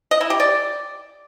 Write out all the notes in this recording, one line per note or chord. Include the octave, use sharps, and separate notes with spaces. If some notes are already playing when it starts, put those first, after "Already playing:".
D#5
E4
G4
D5